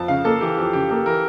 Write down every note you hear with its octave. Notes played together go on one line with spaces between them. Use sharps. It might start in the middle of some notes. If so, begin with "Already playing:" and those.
Already playing: F2 A5
C#3 F5
A#3 A4
E3 G4
F2 G4
C#3 G4
A#3 A4
E3 A#4